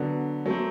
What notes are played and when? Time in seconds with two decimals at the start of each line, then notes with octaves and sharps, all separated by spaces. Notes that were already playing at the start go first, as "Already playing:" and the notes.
Already playing: D3 F#3 B3
0.46 F#3 A3 C4